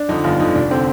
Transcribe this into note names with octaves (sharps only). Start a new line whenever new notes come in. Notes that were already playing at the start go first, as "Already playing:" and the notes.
Already playing: D4
F2 D3 D#4
G1 F4
F2 D3 D#4
F1 D4
D3 C4